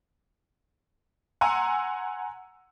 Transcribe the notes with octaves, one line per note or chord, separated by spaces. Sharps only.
F#5 G#5 A#5 C6 E6